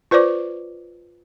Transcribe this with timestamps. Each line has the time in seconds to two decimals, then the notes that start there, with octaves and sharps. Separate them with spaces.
0.11 F4 B4 C5 D5 D6